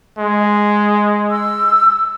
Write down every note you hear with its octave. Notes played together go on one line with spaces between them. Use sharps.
G#3
E6